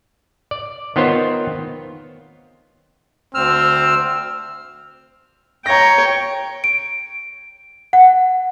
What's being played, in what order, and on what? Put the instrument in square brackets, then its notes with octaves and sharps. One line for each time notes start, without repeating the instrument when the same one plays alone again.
[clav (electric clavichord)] D5
D#3 B3 C4 F4 C5 C#5
[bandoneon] D2 E6 F6 [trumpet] C4
[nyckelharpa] C#5 G5 [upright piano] A#5 A#6
[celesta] D7
F#5